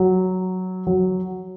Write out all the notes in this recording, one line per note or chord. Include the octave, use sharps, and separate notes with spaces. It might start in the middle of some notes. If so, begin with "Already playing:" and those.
Already playing: F#3
F#3